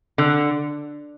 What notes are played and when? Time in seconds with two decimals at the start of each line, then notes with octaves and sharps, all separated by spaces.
0.18 D3